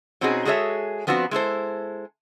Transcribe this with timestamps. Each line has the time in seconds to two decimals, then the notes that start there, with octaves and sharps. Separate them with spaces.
0.21 B2 C4 C#4 D#4 F#4 G#4
0.45 G#3 F#4 G#4 A4 C#5 E5
1.07 F3 B3 C4 D4 F#4
1.31 G#3 E4 A4 C5